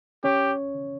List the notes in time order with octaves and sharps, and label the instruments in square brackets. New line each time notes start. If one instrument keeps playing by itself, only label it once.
[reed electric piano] C#4 C#5 [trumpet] G4